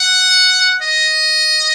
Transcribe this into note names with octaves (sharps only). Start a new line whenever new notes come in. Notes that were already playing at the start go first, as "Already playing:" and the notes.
Already playing: F#5
D#5